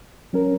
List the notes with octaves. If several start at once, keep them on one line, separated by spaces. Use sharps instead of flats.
F#3 C#4 A#4